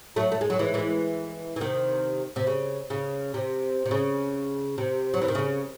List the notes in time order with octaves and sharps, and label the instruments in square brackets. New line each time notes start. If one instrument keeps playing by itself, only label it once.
[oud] F#3 A3
A3
G#3
F#3
E3 G#3
E3 G#3
E3
C3 D#3
C3
C#3
C#3
C3
C3
C#3
C3
F#3
E3
D#3
C#3